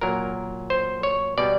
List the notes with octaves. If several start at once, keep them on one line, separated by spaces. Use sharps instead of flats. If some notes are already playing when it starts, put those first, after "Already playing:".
A#2 F#3 A#4
C5
C#5
B2 G3 D5